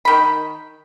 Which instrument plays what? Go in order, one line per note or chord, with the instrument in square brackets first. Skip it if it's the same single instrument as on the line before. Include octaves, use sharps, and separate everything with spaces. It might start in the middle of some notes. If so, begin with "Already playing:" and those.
[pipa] D#3 B5